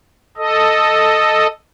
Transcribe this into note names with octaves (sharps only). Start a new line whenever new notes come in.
A4 D#5